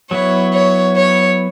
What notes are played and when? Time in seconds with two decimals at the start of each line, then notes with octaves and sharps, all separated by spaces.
0.11 F#3 B3 E4 C#5
0.53 C#5
0.97 C#5